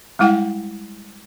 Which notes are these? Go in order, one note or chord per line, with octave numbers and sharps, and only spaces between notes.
G3 G#3 E4 F#5 G5